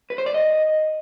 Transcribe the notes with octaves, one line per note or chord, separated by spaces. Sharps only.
B4
C5
D5
D#5